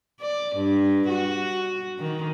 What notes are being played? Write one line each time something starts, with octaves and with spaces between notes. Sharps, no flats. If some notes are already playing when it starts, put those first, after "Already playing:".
D5
G2
F#4
D#3